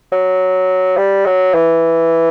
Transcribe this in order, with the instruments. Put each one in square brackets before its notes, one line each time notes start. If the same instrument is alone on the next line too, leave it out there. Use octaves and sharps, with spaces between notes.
[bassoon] F#3
G3
F#3
E3